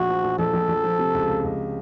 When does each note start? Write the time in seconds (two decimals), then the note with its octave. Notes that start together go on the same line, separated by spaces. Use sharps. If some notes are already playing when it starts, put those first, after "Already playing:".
Already playing: A#1 F#4
0.09 F3
0.24 A#1
0.39 A#1 A4
0.54 A#1
0.69 A#1
0.84 F3
0.99 C3
1.14 C#2
1.29 C#2
1.44 C#2